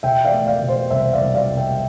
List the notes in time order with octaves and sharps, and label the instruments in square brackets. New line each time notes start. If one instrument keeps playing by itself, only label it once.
[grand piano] B2 E5 G5
D5 F5
A3
D5 F5
B2
C5
C2 C5 E5
D5 F5
C2
D5 F5
C2
E5 G5